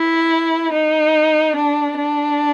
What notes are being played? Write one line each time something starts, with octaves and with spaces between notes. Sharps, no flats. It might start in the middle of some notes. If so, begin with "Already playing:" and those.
Already playing: E4
D#4
D4
D4